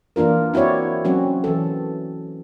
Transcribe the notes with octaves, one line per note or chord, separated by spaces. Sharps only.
E3 A#3 D4 F4 A#4
C4 E4 F#4 C#5 D5
F#3 C4 C#4 F#4
E3 A4